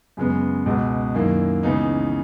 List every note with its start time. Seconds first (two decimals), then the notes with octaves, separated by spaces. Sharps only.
0.17 F#2 C#3 G#3 B3
0.66 C#2 B2 G#3
1.15 F#2 D#3 A#3 E4
1.63 C#2 C#3 E3 B3 D#4